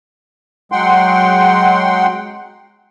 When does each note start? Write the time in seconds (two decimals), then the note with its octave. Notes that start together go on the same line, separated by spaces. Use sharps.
0.72 F#3 G#3 F#5 G5 C6